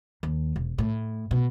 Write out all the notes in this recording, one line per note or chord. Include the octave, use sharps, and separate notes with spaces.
D#2
E1
A2
B2